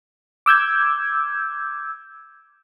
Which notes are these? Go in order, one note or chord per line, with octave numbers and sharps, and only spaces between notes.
D6 E6 G6 G#6